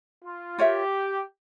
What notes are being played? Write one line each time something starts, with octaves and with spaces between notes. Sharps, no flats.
F4
F4 G4 A#4 C#5 E5